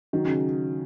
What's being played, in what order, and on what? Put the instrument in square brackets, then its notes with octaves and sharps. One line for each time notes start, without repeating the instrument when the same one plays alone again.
[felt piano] D#3 [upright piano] F#3
[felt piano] C#3